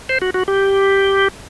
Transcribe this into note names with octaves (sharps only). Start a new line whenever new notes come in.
C5
F#4
F#4
G4